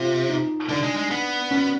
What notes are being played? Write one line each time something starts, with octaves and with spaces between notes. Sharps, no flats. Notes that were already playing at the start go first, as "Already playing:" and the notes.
Already playing: C3 F4
D#4
D3 D4
G#3
G#3
B3
C#4